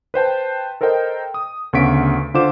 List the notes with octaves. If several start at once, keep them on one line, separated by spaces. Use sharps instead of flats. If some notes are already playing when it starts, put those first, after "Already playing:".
B4 C5 G5 A5
A4 A#4 C5 D#5 G5
D#6
D2 C#3 B3 C#6 B6 D7
D3 F4 C5 D6 E7